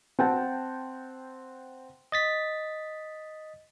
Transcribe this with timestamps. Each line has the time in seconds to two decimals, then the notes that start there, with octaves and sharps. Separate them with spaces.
0.19 C4 F#5 G5 A5
2.12 D#5 A6 B6